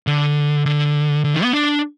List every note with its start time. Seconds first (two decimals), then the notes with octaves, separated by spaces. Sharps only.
0.07 D3
0.66 D3
1.24 D3
1.34 D#3
1.43 B3
1.53 D4